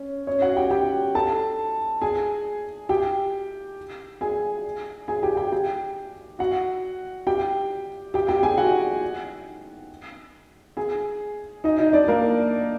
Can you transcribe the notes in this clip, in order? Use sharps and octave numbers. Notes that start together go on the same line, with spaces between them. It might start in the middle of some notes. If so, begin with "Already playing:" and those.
Already playing: C#4
C#4 C#5
F#4 F#5
G4 G5
G4 G5
A4 A5
G#4 G#5
G4 G5
G#4 G#5
G#4 G#5
G4 G5
G4 G5
G4 G5
F#4 F#5
G4 G5
G4 G5
G4 G5
G#4 G#5
F#4 F#5
G#4 G#5
D#4 D#5
D#4 D#5
D4 D5
A#3 A#4